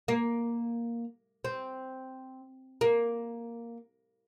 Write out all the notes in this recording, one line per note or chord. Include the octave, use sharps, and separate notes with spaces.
A#3
C4
A#3